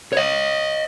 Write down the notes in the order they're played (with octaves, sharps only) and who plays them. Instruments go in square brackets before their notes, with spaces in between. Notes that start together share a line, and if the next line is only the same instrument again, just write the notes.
[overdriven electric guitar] C#5 D#5